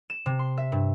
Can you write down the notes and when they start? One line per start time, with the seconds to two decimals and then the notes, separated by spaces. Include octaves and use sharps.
0.10 E7
0.26 C3
0.39 C6
0.57 E5
0.72 G2